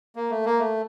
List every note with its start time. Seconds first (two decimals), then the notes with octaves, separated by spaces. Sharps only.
0.16 A#3
0.30 A3
0.45 A#3
0.59 A3